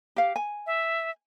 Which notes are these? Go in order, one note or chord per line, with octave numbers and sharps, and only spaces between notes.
G4 F5
G#5
E5